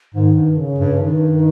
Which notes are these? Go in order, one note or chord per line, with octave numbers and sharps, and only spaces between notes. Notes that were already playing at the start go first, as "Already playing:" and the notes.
G#2 D#3
G2
C#3
G2
G2 D#3